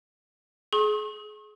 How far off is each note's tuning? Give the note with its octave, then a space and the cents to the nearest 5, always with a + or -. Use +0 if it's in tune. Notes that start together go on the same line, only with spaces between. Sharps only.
G#4 +30 C#6 -45